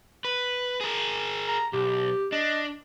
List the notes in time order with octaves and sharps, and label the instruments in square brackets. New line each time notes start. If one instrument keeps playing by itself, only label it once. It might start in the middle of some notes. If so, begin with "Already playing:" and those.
[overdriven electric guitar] B4
G#4 A#4
[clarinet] A#5
[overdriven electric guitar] B1 [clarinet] G4
[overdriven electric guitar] D4 [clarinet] D#5